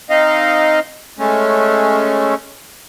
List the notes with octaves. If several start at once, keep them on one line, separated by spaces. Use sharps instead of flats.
C4 D#4 D#5 F5
G#3 A3 C#4